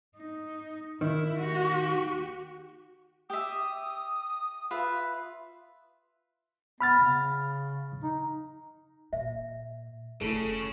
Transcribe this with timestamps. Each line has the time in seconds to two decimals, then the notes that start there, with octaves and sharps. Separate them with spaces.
0.16 D#4
1.01 D#3 E4
1.39 F#4 G4
3.30 G4 E5 D#6
4.71 F4 B4 E5
6.81 B3 B5 F6 A6
6.99 C#3
8.03 D#4
9.13 A#2 E5
10.21 F1 C#3 A3 B3 E4